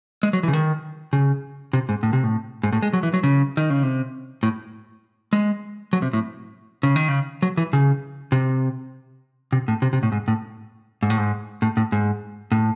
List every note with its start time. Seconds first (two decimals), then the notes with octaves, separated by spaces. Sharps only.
0.23 G#3
0.33 F#3
0.43 E3
0.48 C#3
0.53 D#3
1.13 C#3
1.73 C3
1.89 G#2
2.03 A2
2.13 C3
2.24 A2
2.63 G#2
2.72 A2
2.82 G#3
2.93 F#3
3.03 E3
3.14 F#3
3.23 C#3
3.57 D#3
3.70 C#3
3.83 C3
4.43 A2
5.33 G#3
5.93 F#3
6.02 C3
6.13 A2
6.83 C#3
6.96 D#3
7.08 C#3
7.42 F#3
7.57 E3
7.73 C#3
8.32 C3
9.52 C3
9.68 A2
9.82 C3
9.93 C3
10.03 A2
10.12 G#2
10.28 A2
11.03 G#2
11.10 A2
11.18 G#2
11.62 A2
11.77 A2
11.92 G#2
12.52 A2